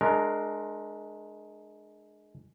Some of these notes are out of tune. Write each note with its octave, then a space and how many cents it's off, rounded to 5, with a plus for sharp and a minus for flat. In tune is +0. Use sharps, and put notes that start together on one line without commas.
G#3 +20 D4 +30 A#4 +0